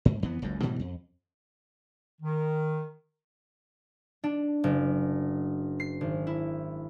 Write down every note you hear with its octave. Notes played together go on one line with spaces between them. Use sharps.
G#2
F2 E3 B3
F#1 C#2 F#2
G#2 B2 E3 G3
F2
D#3
D4
F#1
C7
G#1
E4